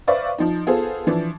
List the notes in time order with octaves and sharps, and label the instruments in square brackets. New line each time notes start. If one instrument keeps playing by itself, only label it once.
[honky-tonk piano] B4 C5 D5 E5 F5 C#6
F3 D#4
B3 F4 G#4 A4 C5
E3 F3 D4